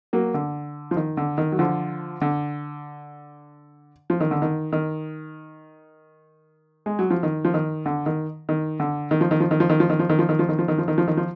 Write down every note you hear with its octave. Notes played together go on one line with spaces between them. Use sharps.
F#3 A#3
D3
F3
D#3
D3
D#3
F#3
D3 F3
D3
F3
D#3
D3
D#3
D#3
G#3
F#3
F3
D#3
F3
D#3
D3
D#3
D#3
D3
D#3
F3
D#3
F3
D#3
F3
D#3
F3
D#3
F3
D#3
F3
D#3
F3
D#3
F3
D#3
F3
D#3
F3
D#3
F3